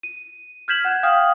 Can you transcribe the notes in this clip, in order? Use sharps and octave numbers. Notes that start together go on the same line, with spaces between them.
D#7
F6 G6 G#6 B6 E7 F#7
F#5 F#6 G#6 E7
F5 G5 D#6 F6